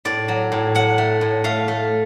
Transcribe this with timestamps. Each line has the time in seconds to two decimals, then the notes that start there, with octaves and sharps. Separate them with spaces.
0.05 A2 D5
0.28 F#3
0.52 A2
0.75 F#3 F#5
0.98 A3
1.21 A2
1.44 A3 F5
1.68 A3